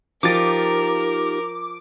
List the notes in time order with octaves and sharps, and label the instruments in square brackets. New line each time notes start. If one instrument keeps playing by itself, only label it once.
[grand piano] F3 A6 [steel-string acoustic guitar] D#4 F4 G4 [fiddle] A#4 [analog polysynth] D6